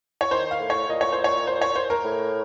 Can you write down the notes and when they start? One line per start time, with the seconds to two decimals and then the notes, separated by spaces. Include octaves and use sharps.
0.21 C#5
0.31 D#3 C5
0.51 F5
0.60 A2
0.70 C#5
0.89 A#2 D#5
1.01 C#5
1.12 C5
1.24 C#5
1.47 C5
1.61 C#5
1.76 C5
1.90 A#4
2.04 A2